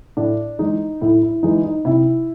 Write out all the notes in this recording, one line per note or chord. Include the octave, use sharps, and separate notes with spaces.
A2 D4
E3 G#3 D#4
A2 E4
E4
E3 G#3 D#4
D#4
C3 E4